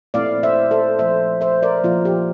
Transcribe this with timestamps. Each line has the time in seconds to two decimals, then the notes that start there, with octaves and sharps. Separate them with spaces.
0.14 A#2 A3 C4 E4 D5 F5
0.43 C5 E5
0.71 A4 C5
0.99 A#2 F3 A3 C5 E5
1.41 C5 E5
1.63 A#4 D5
1.83 A#2 F3 A#3 F4
2.05 G4